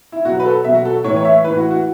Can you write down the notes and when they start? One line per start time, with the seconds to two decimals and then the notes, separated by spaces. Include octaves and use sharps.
0.12 E4
0.25 B2 F#3 F#4
0.40 B4
0.45 A4
0.64 B2 F#3 E5
0.74 F#4
0.85 A4
1.04 A2 C#5
1.08 E3
1.16 C#5
1.25 E5
1.44 E3 B4
1.47 A2
1.57 F#4
1.71 F#4